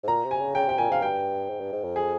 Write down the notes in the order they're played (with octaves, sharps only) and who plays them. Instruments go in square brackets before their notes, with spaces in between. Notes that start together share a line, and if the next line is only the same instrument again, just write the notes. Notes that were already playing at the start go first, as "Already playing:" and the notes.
[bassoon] G#2
[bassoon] A#2 [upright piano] A#5
[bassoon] C3
[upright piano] G#5
[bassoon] C#3
[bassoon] C#3 [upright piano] G5
[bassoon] C3 [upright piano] G5
[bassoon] A#2 [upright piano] G#5
[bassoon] G#2 [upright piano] F5
[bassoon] G2 [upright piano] G5
[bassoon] G#2
G2
G#2
F2
[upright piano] G#4